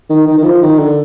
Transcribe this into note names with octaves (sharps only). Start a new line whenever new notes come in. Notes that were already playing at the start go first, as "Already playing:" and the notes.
D#3
D#3
D#3
F3
D#3
D3